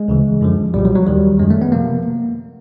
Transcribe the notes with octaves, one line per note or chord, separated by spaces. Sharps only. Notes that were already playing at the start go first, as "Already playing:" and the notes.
Already playing: G#3
D2 C#3 E3
F#2 D3 F3
C2 A#2 F3 G3
F#3
F#3
D#2 D#3 G3
F#2 D#3 G#3
A3
B3
C3 F3 A#3